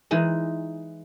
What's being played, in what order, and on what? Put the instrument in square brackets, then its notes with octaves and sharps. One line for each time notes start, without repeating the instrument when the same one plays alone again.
[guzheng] E3 G#3 D#4